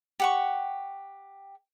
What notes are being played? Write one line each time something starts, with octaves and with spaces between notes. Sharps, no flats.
G4 F#5 C#6